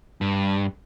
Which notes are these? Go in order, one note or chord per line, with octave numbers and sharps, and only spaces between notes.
G2